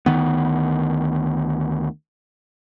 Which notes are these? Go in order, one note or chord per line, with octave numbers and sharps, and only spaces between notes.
D2 D#3 B3